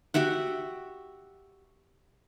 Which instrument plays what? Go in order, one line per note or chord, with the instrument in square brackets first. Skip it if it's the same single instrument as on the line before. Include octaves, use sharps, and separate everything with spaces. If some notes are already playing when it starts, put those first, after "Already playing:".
[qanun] F#4 G4 E5 F#5